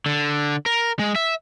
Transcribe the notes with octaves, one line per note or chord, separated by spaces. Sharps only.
D3
A#4
G#3
E5